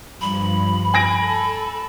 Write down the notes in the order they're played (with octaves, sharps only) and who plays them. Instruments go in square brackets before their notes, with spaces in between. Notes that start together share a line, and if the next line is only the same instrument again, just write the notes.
[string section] G2 F3 [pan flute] B5
[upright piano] G#5 A#6 D7
[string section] A4